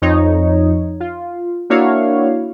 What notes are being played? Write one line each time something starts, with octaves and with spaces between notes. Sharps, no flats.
F2 D#4 C#5
F4
A#3 D4 E4 F#4 C#5 F5